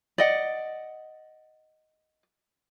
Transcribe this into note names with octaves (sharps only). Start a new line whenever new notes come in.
D5 D#5 F#5